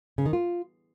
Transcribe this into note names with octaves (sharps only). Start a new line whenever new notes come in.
C#3
D#3
F4